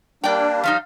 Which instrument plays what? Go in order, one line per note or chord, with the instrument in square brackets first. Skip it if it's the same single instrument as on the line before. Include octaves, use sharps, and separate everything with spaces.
[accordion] G3 A#3 D4 [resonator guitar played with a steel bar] D5 G5
[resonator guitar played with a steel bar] F3 G3 D#4 [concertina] F5